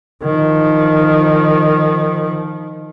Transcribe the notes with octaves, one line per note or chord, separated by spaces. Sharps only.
D#3 F3